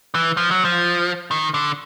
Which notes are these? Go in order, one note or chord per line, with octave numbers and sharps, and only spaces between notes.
E3
F3
F#3
F3
D#3
D3